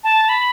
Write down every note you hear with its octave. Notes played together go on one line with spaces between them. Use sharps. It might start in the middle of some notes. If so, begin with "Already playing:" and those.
A5
B5